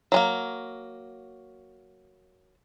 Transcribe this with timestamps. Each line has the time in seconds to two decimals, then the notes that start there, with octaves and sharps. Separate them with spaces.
0.12 F#3 G#3 A#3